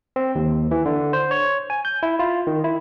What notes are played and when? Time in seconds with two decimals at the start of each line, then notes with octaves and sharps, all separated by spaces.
0.16 C4
0.35 D#2
0.71 E3
0.85 D3
1.13 C5
1.31 C#5
1.70 G#5
1.85 G6
2.03 E4
2.19 F4
2.47 D#3
2.64 E4